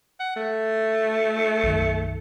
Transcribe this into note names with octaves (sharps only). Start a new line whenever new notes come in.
F#5
A3
B1 F#2 D#3